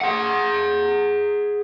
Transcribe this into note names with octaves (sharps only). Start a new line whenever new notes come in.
G#4 F#5